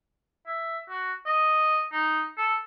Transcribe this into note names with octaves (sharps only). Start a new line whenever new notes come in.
E5
F#4
D#5
D#4
A4